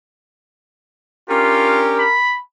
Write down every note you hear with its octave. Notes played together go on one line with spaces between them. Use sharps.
C#4 D4 F4 G4 A#4
B5